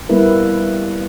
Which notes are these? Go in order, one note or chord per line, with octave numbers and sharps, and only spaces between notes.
G3 A#3 B3 E4 A#4 B4